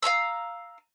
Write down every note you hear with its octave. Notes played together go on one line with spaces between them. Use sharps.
F5 G#5 A#5 E6